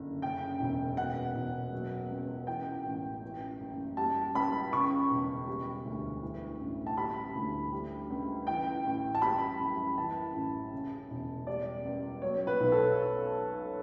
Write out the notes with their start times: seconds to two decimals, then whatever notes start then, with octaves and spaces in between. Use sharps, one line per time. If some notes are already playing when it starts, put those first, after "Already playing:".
Already playing: F#1 D3
0.22 C#3 G5
0.60 E1
0.97 B2 F#5
1.35 E1
1.73 F#3
2.10 C#2
2.47 E3 G5
2.85 A1
3.23 E3
3.60 F#1
3.97 G3 A5
4.35 C#2 B5
4.73 C#3 C#6
5.10 E1
5.47 G3
5.85 D2
6.22 E3
6.60 A1
6.86 A5
6.97 G3 B5
7.35 D2
7.72 G3
8.10 C#2
8.47 E3 G5
8.85 A1
9.15 A5
9.22 G3 B5
9.59 F#2
9.98 E3 A5
10.34 A1
10.73 C#3
11.10 E1
11.47 G3 D5
11.85 C#2
12.22 F#3 C#5
12.47 B4
12.60 B1
12.72 A4